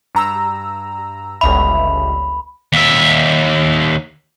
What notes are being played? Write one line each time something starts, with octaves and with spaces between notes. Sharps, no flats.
G2 A#5 E6
G1 C#2 E5 B5
D#2 E5